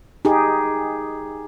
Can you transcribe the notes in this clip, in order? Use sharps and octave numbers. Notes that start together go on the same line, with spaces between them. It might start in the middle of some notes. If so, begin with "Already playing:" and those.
D#4 G4 G#4